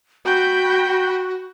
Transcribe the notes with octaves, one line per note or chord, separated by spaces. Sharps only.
F#4 G5 B5 G6